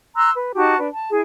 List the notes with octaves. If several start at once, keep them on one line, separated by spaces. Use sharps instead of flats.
A#5 C6 E6 F#6
B4
D#4 F#4 G4 A5
D4 B4
A5
E4 G#4